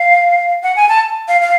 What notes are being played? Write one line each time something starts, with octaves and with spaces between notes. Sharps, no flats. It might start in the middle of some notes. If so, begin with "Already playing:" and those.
Already playing: F5
F#5
G#5
A5
F5
F5